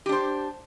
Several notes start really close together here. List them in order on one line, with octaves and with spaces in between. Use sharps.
G4 D4 C5